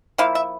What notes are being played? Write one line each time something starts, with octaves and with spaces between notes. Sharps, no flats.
F3 A#3 E4 F5
E5